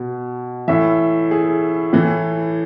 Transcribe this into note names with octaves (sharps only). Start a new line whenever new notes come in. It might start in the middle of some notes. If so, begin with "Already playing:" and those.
Already playing: B2
A2 E3 E5
G#4
A2 E3